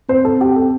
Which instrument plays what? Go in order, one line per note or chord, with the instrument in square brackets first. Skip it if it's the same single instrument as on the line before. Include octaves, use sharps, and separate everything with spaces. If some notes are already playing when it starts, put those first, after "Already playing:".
[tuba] C4 [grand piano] C5
[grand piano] A4
G4
A4